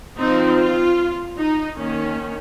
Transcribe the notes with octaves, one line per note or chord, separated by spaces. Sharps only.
F3 C4 D#4
F4
D#4
D#3 A#3 C#4